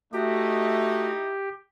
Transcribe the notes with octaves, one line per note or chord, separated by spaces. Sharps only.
A3 D#4 E4 F#4 G4 D#5